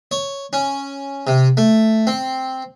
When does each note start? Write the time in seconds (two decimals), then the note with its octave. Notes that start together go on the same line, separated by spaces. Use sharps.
0.11 C#5
0.53 C#4
1.27 C3
1.57 A3
2.07 C4